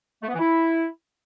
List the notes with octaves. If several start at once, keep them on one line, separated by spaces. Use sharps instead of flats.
A3
B3
E3
E4